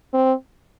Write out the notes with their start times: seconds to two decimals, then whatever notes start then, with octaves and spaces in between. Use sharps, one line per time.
0.14 C4